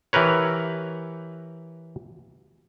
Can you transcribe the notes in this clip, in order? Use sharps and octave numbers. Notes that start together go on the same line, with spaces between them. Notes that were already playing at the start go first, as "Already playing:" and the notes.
E3 G4 A#4 B4 C#5